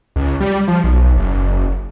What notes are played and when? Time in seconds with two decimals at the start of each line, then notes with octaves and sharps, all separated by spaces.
0.16 C#2
0.40 G3
0.68 F3
0.84 B1
1.16 F#1